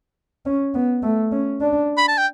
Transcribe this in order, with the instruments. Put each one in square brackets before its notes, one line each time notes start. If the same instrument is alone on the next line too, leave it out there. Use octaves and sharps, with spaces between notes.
[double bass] C#4
B3
A3
C#4
D4
[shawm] B5
A5
G5